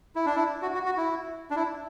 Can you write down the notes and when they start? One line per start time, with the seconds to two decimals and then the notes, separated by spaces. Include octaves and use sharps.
0.16 E4
0.26 D4
0.36 E4
0.62 F#4
0.74 F#4
0.86 F#4
0.97 E4
1.51 D4
1.56 E4